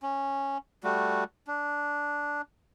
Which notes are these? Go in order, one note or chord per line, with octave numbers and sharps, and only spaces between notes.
C#4
G3 A3 F#4
D4